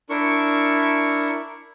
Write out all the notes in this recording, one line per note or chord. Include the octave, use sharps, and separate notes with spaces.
D4 E4 A#4 C#6